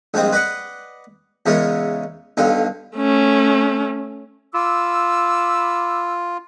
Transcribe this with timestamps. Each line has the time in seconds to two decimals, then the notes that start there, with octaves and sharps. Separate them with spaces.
0.14 A#1 G3 G#3 C4 D#6
0.32 B4 D5 D#5 F#5
1.46 E2 C#3 E3 G#3 A#4
2.37 B1 G2 D3 F5
2.97 A3 C#4
4.54 F4 B5 D6 E6